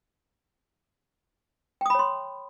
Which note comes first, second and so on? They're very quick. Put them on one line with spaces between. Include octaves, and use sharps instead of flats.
G5 D#6 B5 C#5 C6